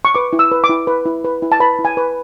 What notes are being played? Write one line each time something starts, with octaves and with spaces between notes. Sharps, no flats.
C#6
B4 D6
E4
E6
B4
D6
E4
B4
E4
B4
E4
A5
B4 B5
E4
G#5
B4